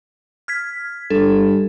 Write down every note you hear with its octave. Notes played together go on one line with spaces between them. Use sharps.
F6 G#6 B6
G2 A4